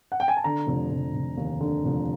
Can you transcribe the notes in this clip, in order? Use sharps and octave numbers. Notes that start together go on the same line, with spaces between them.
F#5
G5
G#5
A5
D3 A#5
F1
F1
F1
D#2
D3
F1